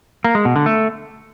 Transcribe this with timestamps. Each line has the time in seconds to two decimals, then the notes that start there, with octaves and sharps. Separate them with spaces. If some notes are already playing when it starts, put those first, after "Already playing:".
0.24 A#3
0.35 G#3
0.45 B2
0.56 D3
0.66 A3